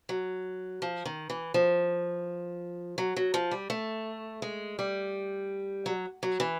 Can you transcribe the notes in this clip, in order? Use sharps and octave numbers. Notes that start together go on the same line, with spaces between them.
F#3
F3
D#3
E3
F3
F#3
F#3
F3
G3
A3
G#3
G3
F#3
F#3
E3